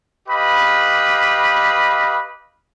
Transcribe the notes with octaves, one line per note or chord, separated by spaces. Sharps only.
G4 B4 D#5 F5 B5